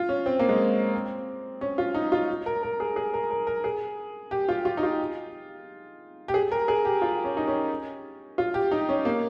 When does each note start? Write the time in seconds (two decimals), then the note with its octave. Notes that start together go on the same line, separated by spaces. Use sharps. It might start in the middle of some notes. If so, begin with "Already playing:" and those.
Already playing: F4
0.09 C#4
0.26 C4
0.39 A#3
0.49 G#3
0.94 C4
1.61 C#4
1.78 F4
1.94 D#4
2.12 F4
2.46 A#4
2.63 A#4
2.80 G#4
2.96 G#4
3.14 A#4
3.30 A#4
3.47 A#4
3.64 G#4
4.31 G4
4.49 F4
4.65 F4
4.77 D#4
4.83 F4
6.28 G4
6.34 G#4
6.52 A#4
6.68 G#4
6.85 G4
7.02 F4
7.24 C#4
7.37 D#4
7.47 C#4
8.38 F4
8.54 G4
8.72 D#4
8.89 C#4
9.05 A#3